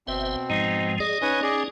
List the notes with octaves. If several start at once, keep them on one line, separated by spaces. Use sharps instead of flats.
G1 B2 C4 C5 E5
G#2 F3 G#3 D#4
G#4 D5 D#5
C#4 D#4 B4 C#5 G#5
G#4 D5